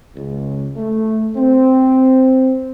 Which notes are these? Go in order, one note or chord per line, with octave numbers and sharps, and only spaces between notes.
C#2
A3
C4